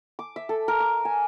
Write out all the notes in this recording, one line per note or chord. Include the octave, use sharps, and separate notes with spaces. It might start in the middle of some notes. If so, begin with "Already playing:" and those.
D6
E5
A4
A#4
D6
G#5